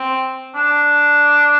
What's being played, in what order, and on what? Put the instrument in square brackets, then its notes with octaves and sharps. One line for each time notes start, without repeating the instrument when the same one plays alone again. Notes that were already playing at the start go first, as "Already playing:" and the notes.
Already playing: [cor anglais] C4
D4